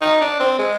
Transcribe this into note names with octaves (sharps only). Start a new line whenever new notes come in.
D#4
D4
C4
G#3